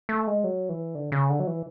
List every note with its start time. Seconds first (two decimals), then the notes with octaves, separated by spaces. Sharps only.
0.09 A3
0.27 G#3
0.44 F#3
0.69 E3
0.95 D3
1.12 C#3
1.30 D3
1.40 F#3
1.47 E3